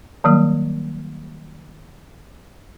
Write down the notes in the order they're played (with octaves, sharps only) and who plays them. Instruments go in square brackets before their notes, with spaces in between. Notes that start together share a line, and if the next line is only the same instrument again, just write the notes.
[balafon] D#3 F#3 G3 A#3